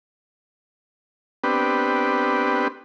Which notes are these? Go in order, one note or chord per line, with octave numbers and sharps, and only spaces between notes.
B3 C4 D4 G4 B4